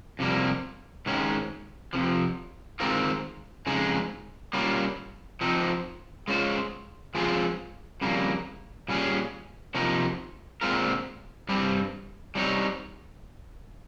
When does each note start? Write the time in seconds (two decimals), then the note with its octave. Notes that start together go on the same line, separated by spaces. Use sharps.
0.19 F2 C3 G3 A#3
1.06 G#2 D#3 G#3 C#4
1.93 F2 C3 F3
2.80 D#3 G#3 C4 F4 A#4
3.67 F2 C#3 G#3 D#4 G#4
4.53 G3 A#3 C#4 F4
5.41 F3 C4 D#4
6.28 G#3 C#4 F4 C5
7.15 F3 G#3 C4 F4 G#4
8.01 F2 C#3 G3 A#3
8.88 A#2 G3 C#4 G#4
9.74 C3 F3 A#3 D#4
10.61 A#2 G#3 C4 F4 A#4
11.49 G2 G3 C4
12.35 G3 C4 D#4 A#4 C#5